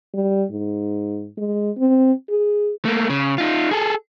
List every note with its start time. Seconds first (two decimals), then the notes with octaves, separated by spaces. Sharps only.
0.14 G3
0.51 G#2
1.37 G#3
1.78 C4
2.30 G#4
2.85 A3 A#3
3.10 C#3
3.38 D#4 F4
3.71 G#4 A4